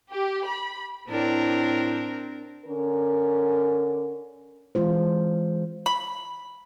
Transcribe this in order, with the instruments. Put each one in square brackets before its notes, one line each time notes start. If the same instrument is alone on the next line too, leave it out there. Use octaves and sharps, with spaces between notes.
[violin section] G4
B5
[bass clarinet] A2 [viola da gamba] C4 D4 A#4
[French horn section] D3 C#4 A#4
[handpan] E3 G#3 F4 C5
[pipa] B5